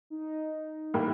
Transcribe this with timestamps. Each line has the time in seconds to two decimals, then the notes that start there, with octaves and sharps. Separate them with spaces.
0.10 D#4
0.94 A2 E3 G3 A#3